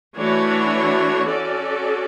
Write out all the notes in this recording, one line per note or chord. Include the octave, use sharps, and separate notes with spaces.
E3 A3 D4 F#4 C#5
C#4 F#4 A4 D5